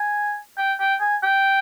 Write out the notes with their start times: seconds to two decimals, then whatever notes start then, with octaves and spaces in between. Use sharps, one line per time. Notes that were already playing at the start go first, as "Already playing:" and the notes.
Already playing: G#5
0.58 G5
0.80 G5
1.01 G#5
1.23 G5